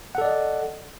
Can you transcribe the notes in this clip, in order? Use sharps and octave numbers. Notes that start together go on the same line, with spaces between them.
A4 D5 D#5 F#5